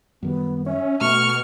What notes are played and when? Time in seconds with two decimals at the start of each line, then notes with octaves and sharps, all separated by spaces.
0.23 F#2 D#3 G3 B3
0.66 C#4 E5
1.01 B2 A3 C#6 F6